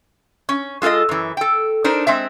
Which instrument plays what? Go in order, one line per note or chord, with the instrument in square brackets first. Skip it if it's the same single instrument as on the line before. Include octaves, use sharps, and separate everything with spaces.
[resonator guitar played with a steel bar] C#4
G#3 F4 G#4 A4 D#5
F#2 E3
A4 G5
D4 D#4 A#4 C5
G#3 C4 E5